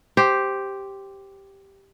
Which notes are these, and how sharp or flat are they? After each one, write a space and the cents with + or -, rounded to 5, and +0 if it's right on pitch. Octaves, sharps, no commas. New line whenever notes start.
G4 +0 C5 +0